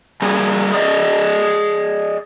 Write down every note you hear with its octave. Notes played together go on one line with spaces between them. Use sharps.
G3 A#3 G#4
G#4 D5 D#5